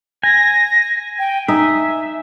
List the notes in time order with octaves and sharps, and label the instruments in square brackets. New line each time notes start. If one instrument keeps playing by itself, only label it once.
[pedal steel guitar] G#5 [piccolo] A#6
[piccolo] G5
[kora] D#4 [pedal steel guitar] E5 [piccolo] G#5